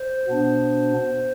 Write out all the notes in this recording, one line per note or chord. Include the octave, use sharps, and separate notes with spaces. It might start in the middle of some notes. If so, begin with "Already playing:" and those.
Already playing: C5
B2 B3 D4